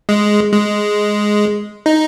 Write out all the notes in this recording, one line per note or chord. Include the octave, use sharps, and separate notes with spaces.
G#3
G#3
D#4